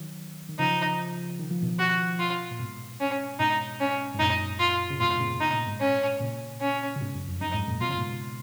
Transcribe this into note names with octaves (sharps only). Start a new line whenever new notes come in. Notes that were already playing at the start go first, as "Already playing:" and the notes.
Already playing: D#3 F#3
D#3
C#3 F3 D#4
D#3
F3
B2 D#3
F#4
F4
A#2
G#2 B2
C#4
G#2 B2 D#4
C#4
G#2
F#2 A#2 D#4
F4
C#3
G#2 B2 F4
A#2 C#3
B2 D#4
A#2
G#2 B2
C#4
A#2 C#3
C#4
C#3
G#2 B2
F#2
F2
F#2 D#4
F2 G#2
F#2 A#2
B2 F4
C#3
G#2 B2